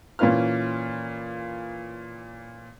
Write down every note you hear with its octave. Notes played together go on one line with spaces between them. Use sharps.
A#2 E3 C#4 F4 B4 F6